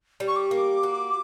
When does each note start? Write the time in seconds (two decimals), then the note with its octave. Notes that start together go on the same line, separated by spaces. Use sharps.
0.20 G3
0.28 C#6
0.36 D6
0.51 A#3
0.83 F#4